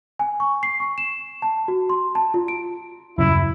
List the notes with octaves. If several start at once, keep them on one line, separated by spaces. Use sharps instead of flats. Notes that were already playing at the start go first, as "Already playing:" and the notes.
G#5
C#6
C7
C#6
E7
A5
F#4
C6
A5
F4
D7
D#1 F#2 C#3 E4